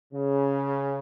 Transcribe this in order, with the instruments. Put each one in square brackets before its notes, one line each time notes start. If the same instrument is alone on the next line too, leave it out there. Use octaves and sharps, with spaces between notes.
[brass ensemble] C#3